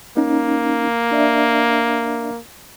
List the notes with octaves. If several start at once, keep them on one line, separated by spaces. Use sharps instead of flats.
A#3 C#4 D#4
D4 D5 E5